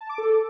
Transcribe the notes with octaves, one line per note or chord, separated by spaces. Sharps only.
A5
D6
A4